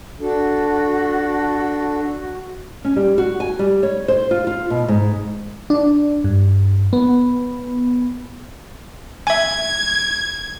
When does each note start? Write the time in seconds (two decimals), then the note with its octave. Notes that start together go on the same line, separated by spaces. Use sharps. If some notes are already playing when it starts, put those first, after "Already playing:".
0.20 D4 F#4 A4
2.85 C#4
2.96 G3
3.18 F#4
3.40 G#5
3.59 G3
3.83 C#5
4.08 C5
4.31 F4
4.47 F4
4.70 B2
4.88 G#2
5.70 D4
6.24 G2
6.93 B3
9.27 E5 G#5 G#6